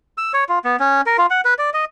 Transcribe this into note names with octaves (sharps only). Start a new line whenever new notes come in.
E6
C#5
F4
B3
C#4
A#4
F4
F#5
B4
D5
D#5